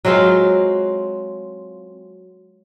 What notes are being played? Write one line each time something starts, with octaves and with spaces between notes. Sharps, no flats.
F#3 G#3 C4 F4